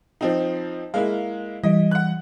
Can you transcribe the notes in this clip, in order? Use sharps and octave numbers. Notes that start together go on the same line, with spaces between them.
F3 C4 D#4
G#3 A#3 E4 F5
E3 G3 D#5
F#5 F#6